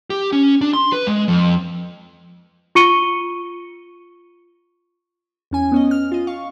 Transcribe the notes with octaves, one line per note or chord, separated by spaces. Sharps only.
G4
C#4
D4
C6
B4
G#3
F2
F4 C#6 C#7 D#7 G7
E2 C#4 G#5
B3 C#4 D#5
F6
F4 D#5
F5 C#6